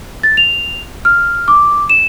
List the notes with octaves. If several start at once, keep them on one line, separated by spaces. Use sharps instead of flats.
A6
F7
F6
D6
E7